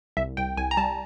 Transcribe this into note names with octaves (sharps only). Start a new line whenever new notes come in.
C2 E5
C2 G5
C2 G#5
A#5
G3 A5